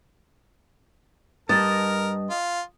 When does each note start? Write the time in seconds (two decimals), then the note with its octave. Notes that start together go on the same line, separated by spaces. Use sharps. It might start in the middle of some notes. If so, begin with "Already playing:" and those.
1.49 G2 A#4 D#5 A5
2.30 F4